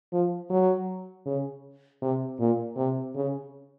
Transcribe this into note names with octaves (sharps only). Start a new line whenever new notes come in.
F3
F#3
C#3
C3
A#2
C3
C#3